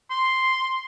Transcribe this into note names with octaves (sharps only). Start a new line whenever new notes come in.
C6